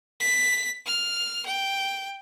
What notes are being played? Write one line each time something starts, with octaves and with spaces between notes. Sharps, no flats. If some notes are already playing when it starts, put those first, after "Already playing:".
B6
F6
G5